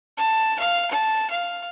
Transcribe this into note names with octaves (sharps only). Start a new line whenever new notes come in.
A5
F5
A5
F5